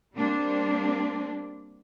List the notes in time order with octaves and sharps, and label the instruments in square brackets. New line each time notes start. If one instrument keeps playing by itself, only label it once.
[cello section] G3 A#3 C4 D4